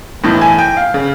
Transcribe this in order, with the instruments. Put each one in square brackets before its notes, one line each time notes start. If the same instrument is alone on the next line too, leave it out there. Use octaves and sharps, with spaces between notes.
[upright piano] B1 A2 E3
G#5
G5
F5
C#3